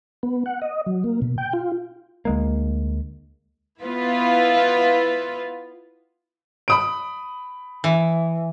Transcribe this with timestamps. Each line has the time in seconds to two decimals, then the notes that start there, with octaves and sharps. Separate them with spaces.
0.23 B3
0.46 F#5
0.62 D#5
0.86 F#3
1.04 A#3
1.22 B2
1.38 G5
1.53 F4
2.25 D2 G#3 A#3
3.84 B3 E4 F4 B4
6.68 B5 D#6 D7
7.84 E3